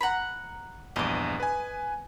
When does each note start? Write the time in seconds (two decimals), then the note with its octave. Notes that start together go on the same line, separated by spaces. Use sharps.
0.01 F#5 A#5 B5
0.96 A#1 E2 G2 D#5 D6
1.40 B4 G#5